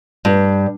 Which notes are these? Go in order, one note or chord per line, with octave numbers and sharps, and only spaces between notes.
G2